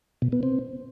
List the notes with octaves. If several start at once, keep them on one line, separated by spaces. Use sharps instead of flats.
B2
B3
C4